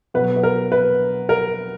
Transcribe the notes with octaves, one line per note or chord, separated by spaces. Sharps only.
B2 F#3 B4
B4
A#4
B4
A#4